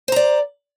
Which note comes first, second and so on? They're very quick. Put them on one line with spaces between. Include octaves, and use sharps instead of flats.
C5 A#5 D5